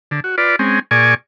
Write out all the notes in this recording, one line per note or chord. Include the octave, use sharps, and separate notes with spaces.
D3
F#4
F4 B4 D5
G#3 C4 C#4
A#2 G#4 D5 G#5 C#6